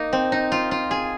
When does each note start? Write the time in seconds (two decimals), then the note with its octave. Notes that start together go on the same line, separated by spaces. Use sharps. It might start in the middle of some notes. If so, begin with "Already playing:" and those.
Already playing: A#3 D#4
0.13 C4
0.32 D#4
0.52 F4
0.71 F4
0.91 G#4